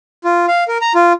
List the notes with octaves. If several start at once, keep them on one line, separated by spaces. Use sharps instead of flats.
F4
F5
A#4
A#5
F4